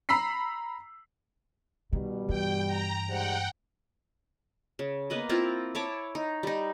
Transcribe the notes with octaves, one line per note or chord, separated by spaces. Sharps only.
A#5 B5 E6 B6 C7
B2 D#3 G3
G2 E3 G5
A#5
G#2 G3 C5 F#5 G5
C#3
A#3 B3 B4 D#5
C4 E4 F4 A#4
E4 C#5 A5 D6
D#4
G3 D#4